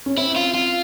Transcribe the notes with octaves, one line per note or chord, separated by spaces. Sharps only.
C#4
C4 E4
F4
F4